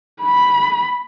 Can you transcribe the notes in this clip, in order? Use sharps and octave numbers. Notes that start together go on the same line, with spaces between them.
B5